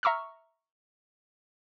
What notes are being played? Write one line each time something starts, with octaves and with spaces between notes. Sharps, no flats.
E5 A#5 C#6 E6 F6